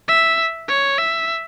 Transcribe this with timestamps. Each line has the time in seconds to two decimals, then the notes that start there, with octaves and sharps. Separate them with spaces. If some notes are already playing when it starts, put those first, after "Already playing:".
0.08 E5
0.68 C#5
0.98 E5